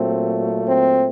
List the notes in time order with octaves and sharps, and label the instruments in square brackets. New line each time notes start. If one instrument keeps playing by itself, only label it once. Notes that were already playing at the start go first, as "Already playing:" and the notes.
Already playing: [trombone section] A#2 F#3 A3 C4
C4